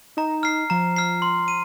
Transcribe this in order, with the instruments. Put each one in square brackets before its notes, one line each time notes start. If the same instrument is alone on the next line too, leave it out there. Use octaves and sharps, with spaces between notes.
[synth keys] D#4 [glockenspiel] A#5
[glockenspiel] F6 C7
[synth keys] F3 [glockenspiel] A#5
[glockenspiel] F6 C7
C6
D#7